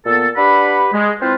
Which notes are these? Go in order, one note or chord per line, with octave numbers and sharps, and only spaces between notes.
A#2 B3 A4
D4 G4 B4 F#5 B5
G#3
C4 E4 F4 B4 C5